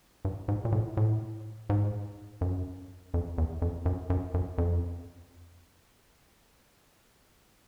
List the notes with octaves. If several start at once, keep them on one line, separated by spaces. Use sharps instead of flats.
G2
G#2
A#2
A2
A2
G#2
F#2
F2
E2
F2
F#2
F#2
F#2
F2